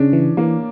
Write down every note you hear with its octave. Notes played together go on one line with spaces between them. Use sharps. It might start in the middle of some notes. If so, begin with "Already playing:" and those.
Already playing: C#3 C#4 D4
E3
E3 A#3